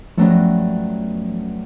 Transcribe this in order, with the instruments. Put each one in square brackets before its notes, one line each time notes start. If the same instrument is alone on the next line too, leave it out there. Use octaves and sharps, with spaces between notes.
[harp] G2 F#3 A3 [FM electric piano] F3 B3 C#4